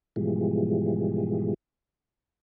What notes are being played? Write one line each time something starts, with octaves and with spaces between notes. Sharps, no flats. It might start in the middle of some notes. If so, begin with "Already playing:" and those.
G#2 B2 E3 F3 G3 G#3